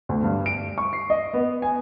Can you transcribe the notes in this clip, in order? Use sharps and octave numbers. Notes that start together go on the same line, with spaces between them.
D2
G2
D7
C#6
C7
D#5
B3
G#5